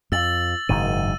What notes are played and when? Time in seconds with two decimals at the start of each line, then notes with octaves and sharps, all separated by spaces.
0.12 F2 E6 A6 F#7
0.69 F#1 G#2 D#3 D#7